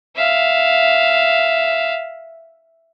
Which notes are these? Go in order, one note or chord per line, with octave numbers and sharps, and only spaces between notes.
E5 F5